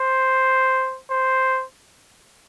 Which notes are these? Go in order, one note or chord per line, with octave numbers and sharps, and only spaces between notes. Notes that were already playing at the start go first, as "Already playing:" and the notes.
Already playing: C5
C5